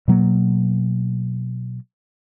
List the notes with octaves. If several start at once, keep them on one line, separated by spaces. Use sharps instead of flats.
B2 F#3 A#3